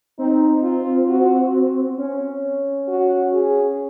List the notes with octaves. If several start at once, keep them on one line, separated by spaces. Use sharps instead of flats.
C4 D#4
F4
F#4
C#4
F#4
G#4